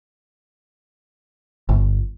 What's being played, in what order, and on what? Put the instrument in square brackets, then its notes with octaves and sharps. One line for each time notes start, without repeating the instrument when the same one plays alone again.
[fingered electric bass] G1